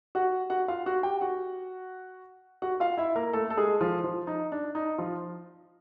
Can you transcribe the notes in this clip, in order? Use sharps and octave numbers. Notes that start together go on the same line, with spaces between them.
F#4 F#5
F#4 F#5
F4 F5
F#4 F#5
G4 G5
F#4 F#5
F#4 F#5
F4 F5
E4 E5
A#3 A#4
A3 A4
A4
G#3 G#4
F3 F4
F3 F4
D#4
D4
D#4
F3 F4